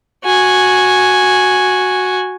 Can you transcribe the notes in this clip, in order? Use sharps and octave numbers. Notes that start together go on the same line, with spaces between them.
F#4 G#5